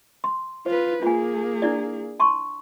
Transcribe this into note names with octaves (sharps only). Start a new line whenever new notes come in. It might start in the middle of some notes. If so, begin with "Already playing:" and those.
C6
F4 B4 C5
A#3 F4 G#4 G#5
D4 E4 D5
A5 C6 C#6